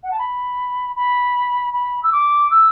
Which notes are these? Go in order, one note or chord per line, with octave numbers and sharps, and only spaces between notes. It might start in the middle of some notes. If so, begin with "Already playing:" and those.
F#5
A5
B5
B5
B5
E6
D6
E6